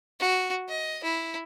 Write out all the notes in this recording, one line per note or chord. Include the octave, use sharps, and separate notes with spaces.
F#4
D#5
E4